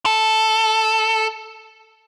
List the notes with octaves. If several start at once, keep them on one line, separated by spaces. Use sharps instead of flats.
A4